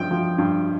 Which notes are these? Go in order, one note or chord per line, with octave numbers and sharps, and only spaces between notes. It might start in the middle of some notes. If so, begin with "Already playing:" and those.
Already playing: G2 F3 G5
F3
G2